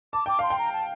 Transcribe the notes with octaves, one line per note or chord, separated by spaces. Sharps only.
A5 D6
G5 D6
F5 C6
G5
A#5
A5